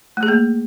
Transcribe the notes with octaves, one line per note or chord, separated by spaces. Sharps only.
A3
G#4
A#3